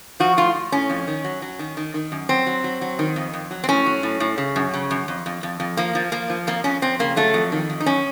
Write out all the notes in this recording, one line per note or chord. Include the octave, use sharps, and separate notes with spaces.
F3 F#4
A2 F4
A2
A2 C#4
F2
D#3
F#3
F#3
D#3
D#3
D#3
F#2
F#3 C4
F#3
F#3
F#3
D#3
F2
F2
F#3
C4
A2 C#4
F#3
A2
A2
C#3
F#2
C#3
F#2
F2
F2
F2
F2
F3 A#3
F3
F3 A#3
F3
F2 A#3
F2 C#4
F2 C4
C#3 A#3
F#3 A3
F2
D#3
F2
D#4
F#2 C#4